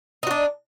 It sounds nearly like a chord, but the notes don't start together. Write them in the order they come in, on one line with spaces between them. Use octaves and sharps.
D#4 F#4 D4